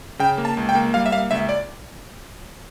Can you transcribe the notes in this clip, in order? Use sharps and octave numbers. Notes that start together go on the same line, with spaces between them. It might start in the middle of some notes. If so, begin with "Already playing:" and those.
C#3 G5
A#3
A5
C#2
G5
A#3
G3 F5
E5
A#3 F5
C#2 E5
D5